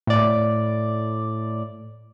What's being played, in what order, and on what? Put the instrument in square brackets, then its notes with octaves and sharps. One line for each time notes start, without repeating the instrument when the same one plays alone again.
[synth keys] A2 D5